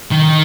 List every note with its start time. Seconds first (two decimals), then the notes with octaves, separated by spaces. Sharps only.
0.11 D#3